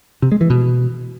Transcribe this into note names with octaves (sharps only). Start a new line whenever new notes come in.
C3
G#3
E3
B2